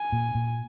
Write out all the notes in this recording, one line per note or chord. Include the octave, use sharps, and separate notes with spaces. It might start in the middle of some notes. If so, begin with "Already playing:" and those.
Already playing: G#5
A#2
A#2